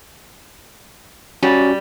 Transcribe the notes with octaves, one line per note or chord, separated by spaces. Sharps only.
G3 C#4 F#4